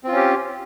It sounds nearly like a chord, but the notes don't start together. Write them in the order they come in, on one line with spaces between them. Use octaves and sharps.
C4 F4 C#4 G4